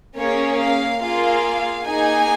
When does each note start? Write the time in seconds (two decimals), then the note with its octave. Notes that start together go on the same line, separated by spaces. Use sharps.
0.19 A#3 C#4 G#4 C#5
0.61 F5
1.02 A#3 F4 G#4 F5
1.86 A#3 D#4 G#4 G#5